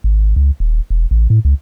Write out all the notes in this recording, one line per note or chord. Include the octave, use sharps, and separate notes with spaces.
G#1
C#2
D#1
E1
A1
A2
C#2